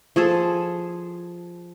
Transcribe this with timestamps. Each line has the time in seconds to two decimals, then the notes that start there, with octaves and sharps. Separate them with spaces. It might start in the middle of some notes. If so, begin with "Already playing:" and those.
0.16 F3 G#4 A4